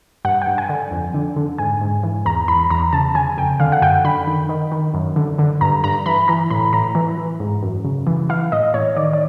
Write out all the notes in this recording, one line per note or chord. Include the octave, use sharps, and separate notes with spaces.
G2 F#5
G5
G2
G#5
D3
F2
D3
D3
G#2 G#5
G#2
E3
E2 A#5
E2 B5
E2 A#5
C#3 A5
C#3 G#5
F2 G5
D3 F5
F#5
F#2 G5
D3 B5
D#3
D#3
D#3
F#2
D3
D3
G2 A#5
G2 A#5
E3 B5
E3 A#5
A2 B5
A2 A#5
E3
E3
G#2
F#2
C#3
E3
E3 F5
A2 D#5
A2 C#5
D#3 D5
D5